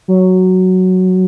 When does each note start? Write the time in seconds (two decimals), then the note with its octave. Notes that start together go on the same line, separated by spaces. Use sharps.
0.08 F#3